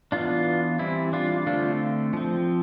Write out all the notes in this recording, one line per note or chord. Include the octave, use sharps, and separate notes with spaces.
E3 B3 D4 F4
E3 G3 C4 E4
D4 F4
D3 A3 C4 D4 F4
F3 C4